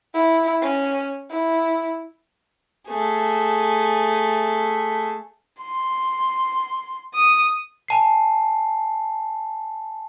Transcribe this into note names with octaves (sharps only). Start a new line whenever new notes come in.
E4
C#4
E4
A3 G#4
C6
D#6
G#5 A5 C7